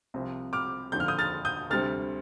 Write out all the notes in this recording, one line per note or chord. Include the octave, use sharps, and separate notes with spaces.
C2 C3 F3
D6 F6
F1 D#2 D3 F3 G6
F6
D#6 G6
F6 A6
D#6 G6
D2 C3 G3 C4 F6 A6